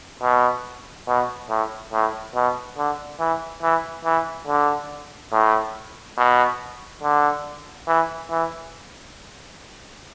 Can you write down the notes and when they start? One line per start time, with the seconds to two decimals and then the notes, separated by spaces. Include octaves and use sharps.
0.22 B2
1.07 B2
1.50 A2
1.93 A2
2.35 B2
2.77 D3
3.20 E3
3.63 E3
4.05 E3
4.47 D3
5.32 A2
6.17 B2
7.03 D3
7.87 E3
8.31 E3